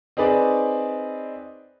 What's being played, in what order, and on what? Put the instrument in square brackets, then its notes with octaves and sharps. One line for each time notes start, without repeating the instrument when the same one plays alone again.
[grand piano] C4 D#4 G#4 B4 D5